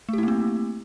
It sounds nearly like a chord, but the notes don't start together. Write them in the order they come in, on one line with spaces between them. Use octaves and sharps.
A3 G4 E4 A#3 C4